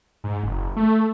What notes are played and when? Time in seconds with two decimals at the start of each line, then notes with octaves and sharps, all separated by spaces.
0.24 G#2
0.43 F#1
0.76 A3